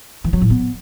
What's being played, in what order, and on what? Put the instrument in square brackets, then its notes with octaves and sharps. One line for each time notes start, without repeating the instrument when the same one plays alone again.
[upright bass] E3
F#3
A2
B3